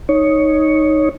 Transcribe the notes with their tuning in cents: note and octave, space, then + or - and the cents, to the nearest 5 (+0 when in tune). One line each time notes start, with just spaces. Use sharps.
D#4 +0 C#5 +0